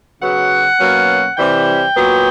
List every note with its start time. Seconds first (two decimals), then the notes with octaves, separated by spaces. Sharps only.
0.20 C#3 F#3 B3 F#5
0.79 B2 F#3 A#3 C#4
1.37 C3 E3 G3 G5
1.96 A#2 F#3 B3